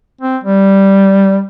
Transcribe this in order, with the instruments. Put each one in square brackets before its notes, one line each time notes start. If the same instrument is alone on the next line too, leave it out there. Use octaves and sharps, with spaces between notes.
[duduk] C4
G3